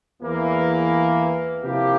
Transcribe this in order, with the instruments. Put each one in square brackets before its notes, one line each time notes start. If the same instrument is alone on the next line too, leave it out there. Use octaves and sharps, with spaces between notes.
[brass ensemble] E2 E3 A#3
C3 F3 A#3 E4 G4